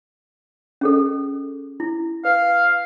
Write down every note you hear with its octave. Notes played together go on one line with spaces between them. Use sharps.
C#4 G#4 A4
E4
B4 F5